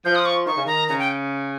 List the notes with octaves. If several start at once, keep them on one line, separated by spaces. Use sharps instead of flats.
F3 G6
D#6
C#6
D#3 C#6
C#3
D#3 A#5
C#3 A#5
G5